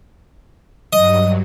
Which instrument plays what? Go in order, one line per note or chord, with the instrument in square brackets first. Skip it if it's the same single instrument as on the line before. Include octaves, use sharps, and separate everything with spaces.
[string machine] G2 F#3 [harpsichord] D#5